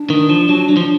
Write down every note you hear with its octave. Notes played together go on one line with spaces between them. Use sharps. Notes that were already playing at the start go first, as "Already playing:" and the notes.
Already playing: D4
D#3
F3
F#3
F#3
F3